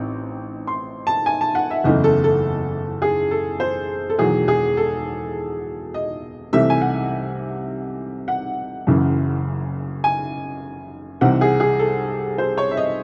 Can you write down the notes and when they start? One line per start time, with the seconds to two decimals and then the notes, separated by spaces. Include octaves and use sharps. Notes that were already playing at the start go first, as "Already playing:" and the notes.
Already playing: A1 C4 D#4
0.67 C6
1.07 A5
1.26 G#5
1.41 A5
1.55 F#5
1.70 E5
1.84 F#1 E2 C#3 E3 A3 D#5
2.04 A4
2.24 A4
3.02 G#4
3.31 A4
3.60 C5
4.10 A4
4.19 E1 E2 D#3 F#3 G#4
4.48 G#4
4.77 A4
5.94 D#5
6.53 C2 C3 E3 A3 E5
6.70 G#5
6.81 F#5
8.28 F#5
8.87 F#1 F#2 C#3 E3
10.04 G#5
11.21 C2 C3 E3 C4 D#4 F#5
11.41 G#4
11.60 G#4
11.79 A4
12.38 C5
12.58 C#5
12.71 E5
12.77 D#5